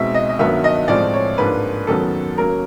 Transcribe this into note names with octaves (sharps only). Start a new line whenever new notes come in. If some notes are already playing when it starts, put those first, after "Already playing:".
Already playing: B2 G#3 C4 D#4 E5
D#5
D#5
G2 D#3 F#3 B3 E5
D#5
A2 F3 G#3 C4 D5
C#5
G#2 F3 A#3 D4 B4
F#2 D#3 F#3 B3 A4
C#3 F#3 A#3 C#4 A#4